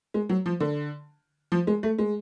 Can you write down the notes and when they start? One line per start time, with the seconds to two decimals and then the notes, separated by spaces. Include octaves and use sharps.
0.14 G#3
0.29 F#3
0.46 F3
0.60 D3
1.52 F3
1.67 G#3
1.83 A3
1.98 G#3